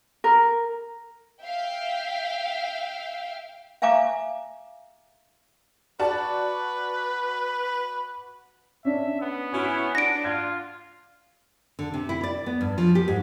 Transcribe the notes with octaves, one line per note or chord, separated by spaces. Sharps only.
A#4
E5 F5 G5
E5 F5 G#5 A#5 D6
F#4 B4 D5 A5
C#4 D4 E5
B3
C#4 E4 F#4
D4 F#5 A#6 D7
F4 G#6
D3
C3
E4
D5
B3
G2
F3
G4
G#2